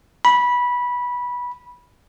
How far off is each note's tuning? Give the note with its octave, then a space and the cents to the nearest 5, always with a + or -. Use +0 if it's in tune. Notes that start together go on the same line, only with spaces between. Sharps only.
B5 -15